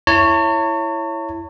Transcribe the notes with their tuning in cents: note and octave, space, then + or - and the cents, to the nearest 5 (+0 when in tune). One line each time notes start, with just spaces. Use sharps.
E4 +10 C#5 +0 A5 +45